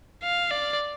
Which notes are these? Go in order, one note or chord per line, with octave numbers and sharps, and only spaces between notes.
F5
D5